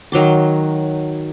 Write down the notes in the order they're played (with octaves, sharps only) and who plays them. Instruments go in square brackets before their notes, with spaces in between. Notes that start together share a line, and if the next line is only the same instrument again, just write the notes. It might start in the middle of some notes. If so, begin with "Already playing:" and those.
[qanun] D#3 F#3 C6 D6